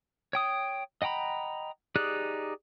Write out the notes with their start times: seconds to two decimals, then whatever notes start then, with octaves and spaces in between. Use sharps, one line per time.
0.33 C#5 G5 D#6
1.02 D#5 F#5 G5 A#5 B5
1.96 D#4 G4 G#4 D5 F#6